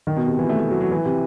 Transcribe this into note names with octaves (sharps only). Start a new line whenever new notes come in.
D#3
B2
C3
E3
A3
A3
F#3
F#3
E3
C3